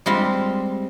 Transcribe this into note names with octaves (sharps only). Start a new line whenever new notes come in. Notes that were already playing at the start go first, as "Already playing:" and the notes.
G3 G#3 C4 F4